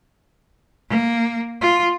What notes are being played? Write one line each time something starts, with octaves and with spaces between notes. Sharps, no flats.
A#3
F4